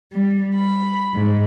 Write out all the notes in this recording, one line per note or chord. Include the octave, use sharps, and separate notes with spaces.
G3
B5
G#2